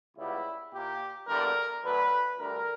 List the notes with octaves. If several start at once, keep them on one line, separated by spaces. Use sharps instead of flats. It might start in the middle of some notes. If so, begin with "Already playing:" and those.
C#2 C#3 G3 B3 E4
A#2 A#3 G4
E2 D3 G3 A#3 A#4
D2 D3 F#3 B4
D2 D3 G3 A#4